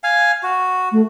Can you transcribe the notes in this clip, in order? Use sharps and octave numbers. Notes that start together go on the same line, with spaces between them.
F5 G#5
F#4
A3